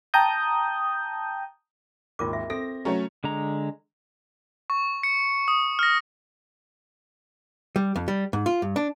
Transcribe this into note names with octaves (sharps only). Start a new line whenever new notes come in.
G5 A5 A#5 D#6 G6
G#1 D#2 F4 A#4 D6
E5
C4 A4 A#6
F#3 A3 C#4 C#5 A#5
D3 G#3 A#5
C#6
C#7
D#6
F6 A#6
G3
F2
G3
G#2
F4
G2
D4